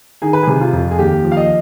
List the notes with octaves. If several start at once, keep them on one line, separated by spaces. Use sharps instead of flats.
D#3 G#4
B4
C3 G#4
F4
F2
G#4
D#2 G4
F3
F5
D#5